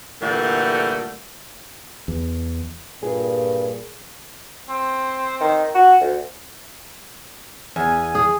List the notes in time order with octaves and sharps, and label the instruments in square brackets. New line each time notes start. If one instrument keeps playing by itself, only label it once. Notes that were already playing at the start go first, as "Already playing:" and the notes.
[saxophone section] A#2 D3 E3 G3 A3
[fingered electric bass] E2
[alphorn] G2 [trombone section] A#2 [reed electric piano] G#4
[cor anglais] C4
[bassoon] D#3
F#4
D2
[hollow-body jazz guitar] E2 [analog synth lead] G#5
[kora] G#4